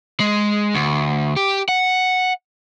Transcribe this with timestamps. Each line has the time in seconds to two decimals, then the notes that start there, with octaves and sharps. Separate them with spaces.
0.20 G#3
0.74 D2
1.36 G4
1.69 F#5